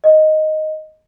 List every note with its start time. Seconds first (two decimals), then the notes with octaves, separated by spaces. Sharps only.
0.04 D#5